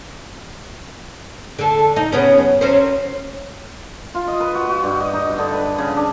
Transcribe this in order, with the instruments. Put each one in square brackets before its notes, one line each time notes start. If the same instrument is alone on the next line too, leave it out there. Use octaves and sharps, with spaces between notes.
[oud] D3 A4
D#4
C#3 B3 C#4
F#2
F#3 C#4 C5
[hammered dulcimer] F4
D#5
B4
F#4
F#4
G2
D#5
D#4
D3
B4
C#3
D4